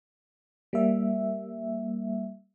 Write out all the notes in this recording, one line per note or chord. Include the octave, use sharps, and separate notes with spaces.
G3 A#3 E5